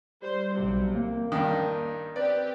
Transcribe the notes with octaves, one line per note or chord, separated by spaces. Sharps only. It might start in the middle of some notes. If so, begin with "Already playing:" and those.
G3 C5
B1 C3
A1 A#3
G2 D#3
C4 G4 B4 D5